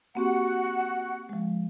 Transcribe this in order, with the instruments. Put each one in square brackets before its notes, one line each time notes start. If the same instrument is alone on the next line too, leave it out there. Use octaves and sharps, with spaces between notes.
[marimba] A#3 C4 G4 [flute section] F#4 F#5
[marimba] F3 G#3